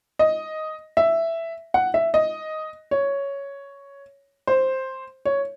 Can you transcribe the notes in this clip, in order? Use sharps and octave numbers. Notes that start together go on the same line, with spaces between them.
D#5
E5
F#5
E5
D#5
C#5
C5
C#5